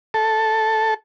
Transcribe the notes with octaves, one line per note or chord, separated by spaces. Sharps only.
A4